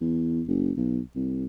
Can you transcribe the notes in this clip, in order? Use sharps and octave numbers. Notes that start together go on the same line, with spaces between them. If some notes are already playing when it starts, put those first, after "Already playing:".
E2
F#1
B1
C2